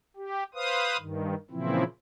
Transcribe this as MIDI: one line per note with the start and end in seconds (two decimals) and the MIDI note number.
0.16 0.43 67
0.54 0.97 71
0.54 0.97 72
0.54 0.97 77
0.54 0.97 87
0.99 1.35 43
0.99 1.35 51
1.51 1.84 46
1.51 1.84 49
1.51 1.84 52
1.51 1.84 53
1.51 1.84 60
1.51 1.84 64